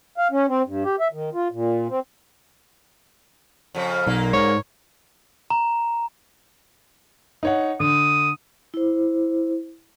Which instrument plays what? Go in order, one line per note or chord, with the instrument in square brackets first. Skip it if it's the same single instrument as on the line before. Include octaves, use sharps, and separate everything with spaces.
[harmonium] F5
C#4
C4
G2
G4
E5
D#3
F4
A#2
C4
[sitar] F2 C#3
[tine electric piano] B1 [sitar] A#2 A#3
[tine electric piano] G#2 [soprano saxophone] C#5
[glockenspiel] A#5
[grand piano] D#4 C#5 F#5
[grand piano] D3 [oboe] D#6
[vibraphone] E4 C5